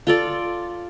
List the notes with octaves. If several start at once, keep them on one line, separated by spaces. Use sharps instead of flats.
F4 A4 D5